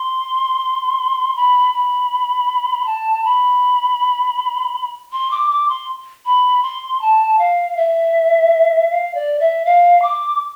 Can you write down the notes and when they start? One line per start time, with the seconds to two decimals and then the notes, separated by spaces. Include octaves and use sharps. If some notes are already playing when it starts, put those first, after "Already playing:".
Already playing: C6
1.36 B5
1.73 B5
2.86 A5
3.24 B5
5.12 C6
5.31 D6
5.51 D6
5.69 C6
6.25 B5
6.63 C6
7.01 A5
7.39 F5
7.77 E5
8.90 F5
9.15 D5
9.40 E5
9.65 F5
10.02 D6